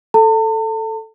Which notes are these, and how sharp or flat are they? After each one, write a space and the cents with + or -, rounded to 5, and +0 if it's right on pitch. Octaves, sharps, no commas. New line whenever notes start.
A4 +0 A5 +45